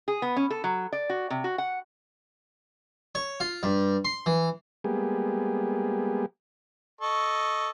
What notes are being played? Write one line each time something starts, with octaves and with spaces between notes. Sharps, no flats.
G#4
B3
C#4
A4
F#3
D5
F#4
C3
F#4
F#5
C#5
F4
G2
C6
E3
G3 G#3 A#3 B3 G4 G#4
A4 D#5 C#6